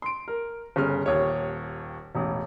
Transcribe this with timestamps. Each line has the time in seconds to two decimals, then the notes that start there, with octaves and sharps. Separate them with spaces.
0.02 C6 D7
0.28 A#4
0.76 G1 C#3 F6
1.06 D#1 D#2 C#5
2.15 E1 A1